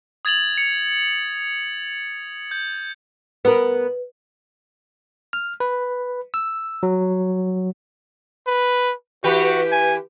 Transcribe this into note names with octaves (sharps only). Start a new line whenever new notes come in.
D#6 G#6 A6 F7 F#7
C#7
G6
B3 A#4 B4
F6
B4
E6
F#3
B4
E3 F#4 G4 B4
G#5